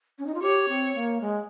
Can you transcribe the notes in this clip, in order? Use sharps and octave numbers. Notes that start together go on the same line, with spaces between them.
C#4
D#4
F4
G4 C#5
C4
A#3
G#3